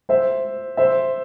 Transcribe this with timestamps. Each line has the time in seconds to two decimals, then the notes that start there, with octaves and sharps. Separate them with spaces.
0.09 C5 E5
0.77 C5 E5